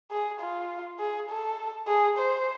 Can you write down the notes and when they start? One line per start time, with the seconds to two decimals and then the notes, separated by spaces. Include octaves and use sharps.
0.11 G#4
0.41 F4
0.99 G#4
1.29 A4
1.88 G#4
2.18 C5